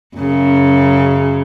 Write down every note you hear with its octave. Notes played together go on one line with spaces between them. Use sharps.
F#2 C#3